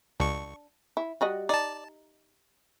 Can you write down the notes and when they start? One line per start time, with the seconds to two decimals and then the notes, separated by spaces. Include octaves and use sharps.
0.20 C#2 D4 C#6
0.97 E4
1.21 G3 F#4 D#5
1.49 D#4 D5 A5